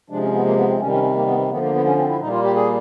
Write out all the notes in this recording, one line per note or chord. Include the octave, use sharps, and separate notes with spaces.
C3 F3 G#3 D4
C#4
B3
A#3
B3
C4
C3 D#3 G3 C#4
C#4
C4
A#3
B3
C4
D3 F3 A#3 B3
A#3
B3
C#4
C4
E4
A#2 G3 A#3 D#4
F4
G4
G#4